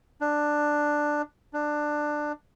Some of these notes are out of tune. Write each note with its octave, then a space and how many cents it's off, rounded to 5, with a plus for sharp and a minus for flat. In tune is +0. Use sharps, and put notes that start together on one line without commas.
D4 +10
D4 +15